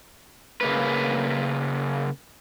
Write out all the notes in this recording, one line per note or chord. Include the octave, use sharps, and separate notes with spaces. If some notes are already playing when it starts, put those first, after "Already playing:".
C#3 A#3 B4